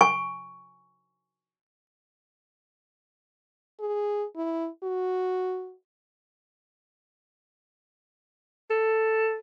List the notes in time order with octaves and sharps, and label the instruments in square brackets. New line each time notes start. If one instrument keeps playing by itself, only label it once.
[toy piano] G#5 C#6
[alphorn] G#4
E4
F#4
[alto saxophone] A4